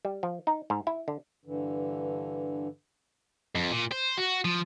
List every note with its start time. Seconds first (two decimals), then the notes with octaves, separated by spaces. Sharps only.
0.05 G3
0.23 F3
0.47 D#4
0.70 G#2
0.87 E4
1.08 D3
1.45 G2 D3 E3
3.55 F2
3.71 A#2
3.91 C5
4.17 F#4
4.45 F3